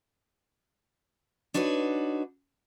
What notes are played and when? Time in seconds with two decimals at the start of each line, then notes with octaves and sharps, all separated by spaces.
1.54 D4 D#4 F#4 B4 C#5